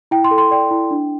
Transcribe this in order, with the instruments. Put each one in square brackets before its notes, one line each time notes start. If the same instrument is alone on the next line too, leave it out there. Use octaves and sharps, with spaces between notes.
[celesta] E4 G5
C6
A4
C6
D5 G5
E4
D4